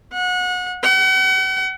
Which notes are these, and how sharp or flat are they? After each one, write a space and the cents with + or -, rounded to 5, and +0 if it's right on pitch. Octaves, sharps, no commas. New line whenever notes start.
F#5 -30
F#5 +40